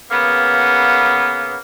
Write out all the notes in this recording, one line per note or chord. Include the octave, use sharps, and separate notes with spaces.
C#3 A#3 B3